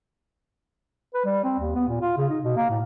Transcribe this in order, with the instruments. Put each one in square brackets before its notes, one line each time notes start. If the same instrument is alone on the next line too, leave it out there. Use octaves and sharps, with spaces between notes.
[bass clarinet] B4
G3
C4
D#2
B3
A#2
F4
C#3
D#4
B2
A#3
A2